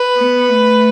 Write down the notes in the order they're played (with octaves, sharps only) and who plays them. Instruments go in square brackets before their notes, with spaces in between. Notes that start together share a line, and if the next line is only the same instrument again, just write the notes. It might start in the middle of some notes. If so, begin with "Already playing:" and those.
Already playing: [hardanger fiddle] B4
[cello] B3
A3